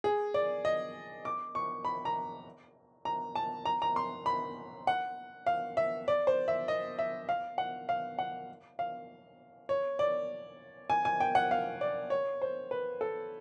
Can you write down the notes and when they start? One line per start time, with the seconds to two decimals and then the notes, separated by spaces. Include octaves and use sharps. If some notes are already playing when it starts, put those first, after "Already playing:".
0.04 G#4
0.34 D5
0.65 D#5
1.25 D6
1.55 C#6
1.85 B5
2.05 A#5
3.05 A#5
3.35 A5
3.65 A#5
3.82 A#5
3.96 C6
4.26 B5
4.87 F#5
5.46 F5
5.77 E5
6.08 D5
6.27 C5
6.48 E5
6.68 D#5
6.99 E5
7.29 F5
7.58 F#5
7.89 F5
8.19 F#5
8.79 F5
9.69 C#5
9.99 D5
10.90 G#5
11.05 G#5
11.20 G5
11.35 F#5
11.51 F5
11.81 D5
12.10 C#5
12.42 C5
12.71 B4
13.01 A4